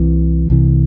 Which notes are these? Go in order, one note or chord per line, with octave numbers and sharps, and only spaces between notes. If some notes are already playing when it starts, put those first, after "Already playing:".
Already playing: C2 C3 E3
C2 C3 E3